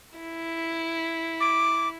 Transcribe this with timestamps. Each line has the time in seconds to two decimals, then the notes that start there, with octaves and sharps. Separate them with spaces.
0.19 E4
1.40 D6